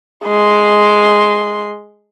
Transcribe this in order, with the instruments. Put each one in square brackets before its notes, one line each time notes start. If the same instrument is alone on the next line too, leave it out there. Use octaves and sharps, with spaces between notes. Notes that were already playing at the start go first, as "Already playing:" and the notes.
[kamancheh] G#3 C6